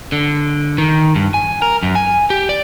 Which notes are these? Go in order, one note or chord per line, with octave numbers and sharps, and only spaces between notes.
D3
D#3
G2
G#5
A#4
F#2
G#5
G4
D5